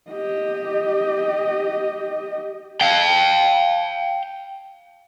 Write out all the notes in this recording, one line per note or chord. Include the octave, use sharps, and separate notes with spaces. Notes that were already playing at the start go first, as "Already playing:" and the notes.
G4 D#5
F5 G5